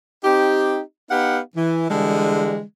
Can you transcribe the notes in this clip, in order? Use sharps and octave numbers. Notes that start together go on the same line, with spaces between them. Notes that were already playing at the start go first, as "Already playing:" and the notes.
C4 D#4 G4
B3 D#4 G4 F5 F#5
E3
D3 E3 G3 G#3